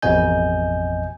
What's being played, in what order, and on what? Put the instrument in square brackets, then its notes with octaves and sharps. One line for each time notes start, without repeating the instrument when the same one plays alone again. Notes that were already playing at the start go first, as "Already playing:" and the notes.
[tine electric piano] A1 F2 B2 D#5 G#5 G6